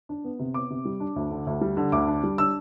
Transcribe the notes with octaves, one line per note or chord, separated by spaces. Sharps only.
D4
B3
C3
B3 D6
C3
G3
D4
D2
D3
D2
G3
D3
D2 D6
D4
G3
D4 E6